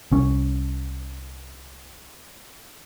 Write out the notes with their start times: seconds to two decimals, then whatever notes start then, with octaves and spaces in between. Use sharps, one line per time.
0.12 C2 C#4